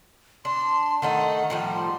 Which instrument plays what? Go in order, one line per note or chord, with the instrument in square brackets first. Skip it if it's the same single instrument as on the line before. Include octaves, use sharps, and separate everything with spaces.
[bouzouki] D4 [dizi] C6
[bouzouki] D#3 A3 D#4 [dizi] F#5
[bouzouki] A2 F3 G3
[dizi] C6